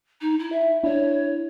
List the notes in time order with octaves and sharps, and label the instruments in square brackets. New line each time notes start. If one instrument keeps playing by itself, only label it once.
[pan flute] D#4
E4
E5
[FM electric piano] D4 E4 [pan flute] C#5